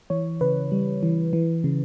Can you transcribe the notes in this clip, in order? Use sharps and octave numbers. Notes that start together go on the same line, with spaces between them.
E3 C#5
C#3 B4
G3
E3
E3
C#3